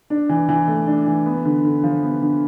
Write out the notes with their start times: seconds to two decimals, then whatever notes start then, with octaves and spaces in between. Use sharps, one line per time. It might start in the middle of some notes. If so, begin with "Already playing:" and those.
0.10 D4
0.29 E3
0.49 E3
0.68 A3
0.87 D4
1.06 E3
1.26 B3
1.45 D3
1.65 D3
1.83 F3
2.03 B3
2.21 D3